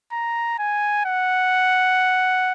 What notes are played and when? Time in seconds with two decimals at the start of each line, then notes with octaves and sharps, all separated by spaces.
0.12 A#5
0.59 G#5
1.05 F#5